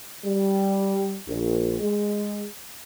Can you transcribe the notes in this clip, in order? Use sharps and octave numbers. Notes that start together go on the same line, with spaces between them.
G3
A#1
G#3